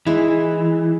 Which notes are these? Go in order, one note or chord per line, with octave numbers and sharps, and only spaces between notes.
E3 G#3 E4